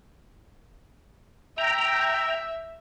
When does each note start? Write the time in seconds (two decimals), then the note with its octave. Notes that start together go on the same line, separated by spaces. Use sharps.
1.58 E5 G5 A#5